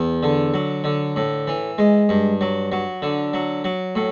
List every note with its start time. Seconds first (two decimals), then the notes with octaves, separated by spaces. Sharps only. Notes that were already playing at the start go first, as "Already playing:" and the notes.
Already playing: E2
0.23 D3
0.54 F#3
0.84 D3
1.16 A2
1.47 E3
1.78 G#3
2.09 G2
2.41 F#3
2.72 F#3
3.02 D3
3.34 F#3
3.64 F#3
3.95 A2